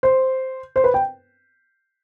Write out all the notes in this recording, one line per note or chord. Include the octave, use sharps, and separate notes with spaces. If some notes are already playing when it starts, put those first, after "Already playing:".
C5
C5
B4
G5